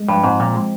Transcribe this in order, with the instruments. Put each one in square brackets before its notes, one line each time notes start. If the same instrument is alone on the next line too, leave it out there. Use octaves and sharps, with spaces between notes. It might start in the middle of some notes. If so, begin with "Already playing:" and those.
Already playing: [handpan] G#3
[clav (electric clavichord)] G2 [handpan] F3
[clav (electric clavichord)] G#2 [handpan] C4
[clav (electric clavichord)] A#2 [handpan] F3
[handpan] G#3